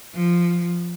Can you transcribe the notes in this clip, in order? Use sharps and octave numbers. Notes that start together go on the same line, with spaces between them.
F3